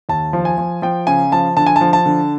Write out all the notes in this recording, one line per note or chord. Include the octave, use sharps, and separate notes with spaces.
D#2 A5
F3
G#5
F3
F3 G5
C#3 G#5
F3 A5
D3 A5
G#5
A5
F3
A5
D3